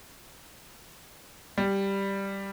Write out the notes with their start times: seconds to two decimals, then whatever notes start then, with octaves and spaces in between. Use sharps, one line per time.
1.58 G3